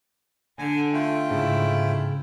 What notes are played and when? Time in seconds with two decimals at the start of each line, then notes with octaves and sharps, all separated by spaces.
0.59 D3 G#5
0.93 A3 F4 G5
1.30 G#2 C#3 E4